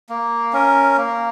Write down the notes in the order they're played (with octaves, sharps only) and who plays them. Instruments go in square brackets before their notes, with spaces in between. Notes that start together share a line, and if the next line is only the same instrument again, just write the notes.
[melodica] A#3
C#4 A#4
A#3